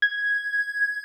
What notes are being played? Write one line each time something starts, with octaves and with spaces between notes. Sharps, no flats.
G#6